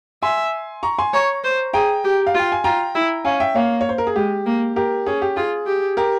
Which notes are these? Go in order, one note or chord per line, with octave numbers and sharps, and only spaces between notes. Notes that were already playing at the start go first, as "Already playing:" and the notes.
E5 G#5 C6
A#5 C#6
G#5 C6
C#5 A#5 C#6
C5
G#4 G5 A#5
G4
F5
F4
G5
G#5
F4 G5 A#5
E4
C#4 F5 G#5
E5 G5
A#3 C#5 F5
C#5
C5
A#4
G#4
G#3 G4
A#3
G4 A#4
C#4 G#4
G4
F4 G#4
G4
G4 A#4